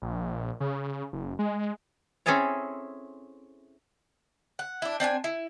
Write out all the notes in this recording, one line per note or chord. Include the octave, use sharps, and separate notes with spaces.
A#1
C#3
F#1
G#3
C4 C#4 E4 G#4 A4 C#5
F#5
D4 E4
C4 D4 F#5 G#5
E4